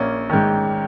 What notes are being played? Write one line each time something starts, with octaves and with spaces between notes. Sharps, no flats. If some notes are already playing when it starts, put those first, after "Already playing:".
Already playing: A#1 A#3 C#4
G#2 D#3